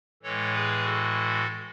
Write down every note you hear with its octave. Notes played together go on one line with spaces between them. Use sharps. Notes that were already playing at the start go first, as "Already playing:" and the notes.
A2 E3 G#3 A4 C#5
G#4 B4
F#4 A4